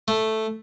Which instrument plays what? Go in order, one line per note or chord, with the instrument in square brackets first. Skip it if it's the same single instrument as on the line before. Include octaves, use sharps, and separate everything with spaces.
[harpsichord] A3